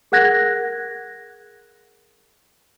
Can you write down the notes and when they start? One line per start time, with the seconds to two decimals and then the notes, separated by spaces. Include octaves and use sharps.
0.12 G#4 A#4 F#5 F#6 G#6 A#6